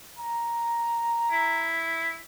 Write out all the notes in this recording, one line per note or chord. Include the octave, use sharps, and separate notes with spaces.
A#5
E4